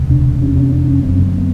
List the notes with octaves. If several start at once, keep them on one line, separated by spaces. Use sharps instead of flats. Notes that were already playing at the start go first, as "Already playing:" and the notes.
Already playing: E1 D2 C3
D4
F1 E2 C3 C#4
C#4
D4
C#4
F#1 F#2 D3 C4
C4
B3